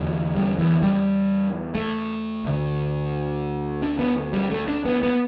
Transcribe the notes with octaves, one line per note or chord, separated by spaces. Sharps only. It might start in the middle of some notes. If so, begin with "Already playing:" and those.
Already playing: E2 D3
G3
E3
G3
A3
D2 D3
D4
B3
G3
A3
D4
B3
B3